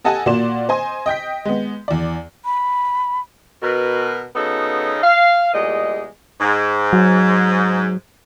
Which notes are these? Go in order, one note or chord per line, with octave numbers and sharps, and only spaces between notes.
G4 A4 D#5 F#5 G#5 A5
A#2 A#3 F#4 D5 C6 E7
C5 D#5 G#5 C6
D#5 G5 G6 B6
G#3 B3
E2 D5
B5
B2 A#4 B4
C#3 B3 C#4 D#4 F#4 A4
F5
E2 A#2 G3 G#3 D#5
G#2
F#3